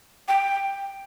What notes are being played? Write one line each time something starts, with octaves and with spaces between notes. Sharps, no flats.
G5